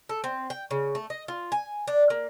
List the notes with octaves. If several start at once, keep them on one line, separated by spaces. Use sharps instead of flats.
A4
C4
G5
C#3
A3
D#5
F4
G#5
D4
A#3